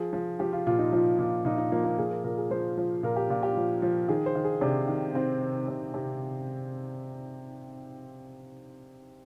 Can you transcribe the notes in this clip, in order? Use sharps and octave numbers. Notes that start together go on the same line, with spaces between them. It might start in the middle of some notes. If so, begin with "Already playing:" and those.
Already playing: F3 G#4
F3
F3 G4
F4
A#2 F4
D#4
F3 F4
A#2
A#2 D#4
D#4
F3 A#3
A#3
A#2 G#4
A#4
A#2 A#4
G#4
F3 C5
F3
A#2 A#4
G4
A#2 F4
G4
F3
F3
D#3 G#4
C5
D#3
G#4
C3 D4
D#3
D#3 C4
D#3
C3
C3